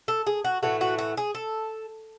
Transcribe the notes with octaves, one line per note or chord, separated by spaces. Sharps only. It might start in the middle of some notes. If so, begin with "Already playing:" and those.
A4
G#4
F#4
A2 E3 A3 F#4
F#4
F#4
G#4
A4